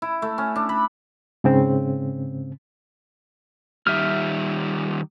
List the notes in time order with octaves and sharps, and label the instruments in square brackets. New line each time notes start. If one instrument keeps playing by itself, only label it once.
[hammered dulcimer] E4
A3
C#4
D4
B5
[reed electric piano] G#2 C#3 C4
[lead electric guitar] D#3 G3 [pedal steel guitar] E5 F6